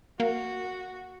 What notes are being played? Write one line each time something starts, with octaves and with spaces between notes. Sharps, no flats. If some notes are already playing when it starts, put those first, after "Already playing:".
A#3 F#4